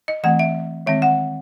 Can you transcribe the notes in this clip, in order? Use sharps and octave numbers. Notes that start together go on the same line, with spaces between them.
D#5
E3 A3 C4 F#5
E5
D#3 G#3 C4 E5
F#5